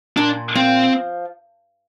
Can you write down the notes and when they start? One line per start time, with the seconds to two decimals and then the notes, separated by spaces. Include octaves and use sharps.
0.17 A#2 D4
0.55 F3 C4